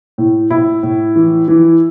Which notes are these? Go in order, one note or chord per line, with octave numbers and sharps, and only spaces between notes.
A2
A2 E4
A2
E3
E3